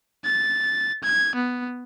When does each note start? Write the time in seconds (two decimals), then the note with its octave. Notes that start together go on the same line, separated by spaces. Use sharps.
0.24 A6
1.04 G#6
1.36 B3